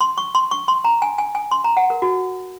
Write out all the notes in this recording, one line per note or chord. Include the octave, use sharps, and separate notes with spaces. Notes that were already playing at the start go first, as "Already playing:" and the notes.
C6
C#6
C6
C#6
C6
A#5
G#5
G#5
G#5
C6
A#5
F#5
A#4
F#4